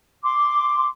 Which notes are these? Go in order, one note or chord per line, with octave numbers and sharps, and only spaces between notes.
C6 D6